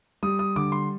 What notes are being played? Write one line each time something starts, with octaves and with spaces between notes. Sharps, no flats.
G3 D#6
D#6
D3 D6
C6